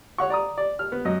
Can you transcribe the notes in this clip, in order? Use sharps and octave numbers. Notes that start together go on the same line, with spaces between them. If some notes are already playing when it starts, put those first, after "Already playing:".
C#5 F#5 C#6
D5 A#5 D#6
D5
F6
B3
F#2 D#5